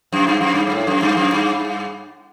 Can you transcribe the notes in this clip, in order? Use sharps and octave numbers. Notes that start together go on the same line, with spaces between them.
F#2
G2
F#2
G2
G2
A2
F#2
G2
F#2
G2